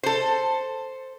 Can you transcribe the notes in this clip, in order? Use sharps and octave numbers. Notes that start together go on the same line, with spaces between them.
A4 C5